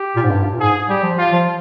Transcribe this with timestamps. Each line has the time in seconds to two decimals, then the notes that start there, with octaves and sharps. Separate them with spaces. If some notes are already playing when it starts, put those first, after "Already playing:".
Already playing: G4
0.16 A#2
0.24 G#2
0.30 G2
0.45 G2
0.54 A#2
0.60 G#2 G#4
0.89 G3 G4
1.03 F3
1.18 F4
1.32 F3